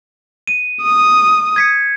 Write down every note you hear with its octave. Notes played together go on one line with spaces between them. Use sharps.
D#7
D#6
G#6 B6 C#7